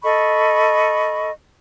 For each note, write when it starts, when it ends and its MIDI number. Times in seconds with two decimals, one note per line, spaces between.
0.04 1.31 69
0.04 1.31 75
0.04 1.31 83
0.04 1.31 85